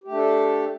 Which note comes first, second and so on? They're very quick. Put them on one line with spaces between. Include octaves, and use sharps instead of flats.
G4 A3 D4 A4